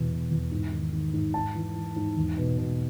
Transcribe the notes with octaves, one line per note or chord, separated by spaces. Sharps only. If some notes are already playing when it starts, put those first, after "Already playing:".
Already playing: E2 B2
B2
E2
G#2
D#3
D#3
G#2
G#2 A5
E3
E3
G#2
E2
B2
B2